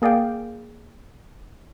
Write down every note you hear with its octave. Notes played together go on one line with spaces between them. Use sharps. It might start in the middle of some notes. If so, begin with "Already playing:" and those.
A#3 G#4 D5 F5 G5